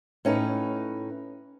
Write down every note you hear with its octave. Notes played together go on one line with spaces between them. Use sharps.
A2 C#4 D#4 B4